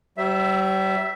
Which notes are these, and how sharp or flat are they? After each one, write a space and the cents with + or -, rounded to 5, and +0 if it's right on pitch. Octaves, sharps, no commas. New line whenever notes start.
G3 -40 C5 +0 E5 +0